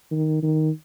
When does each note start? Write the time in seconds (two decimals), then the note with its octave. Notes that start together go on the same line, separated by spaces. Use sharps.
0.11 D#3
0.42 D#3